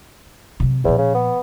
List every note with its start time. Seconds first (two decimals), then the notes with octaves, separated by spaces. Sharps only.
0.60 C3 F#3
0.84 E2 A#2 F3
0.98 C#3
1.15 B3